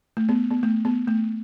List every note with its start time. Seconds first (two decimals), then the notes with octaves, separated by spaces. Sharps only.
0.17 A3
0.29 B3
0.51 B3
0.63 A3
0.85 B3
1.08 A3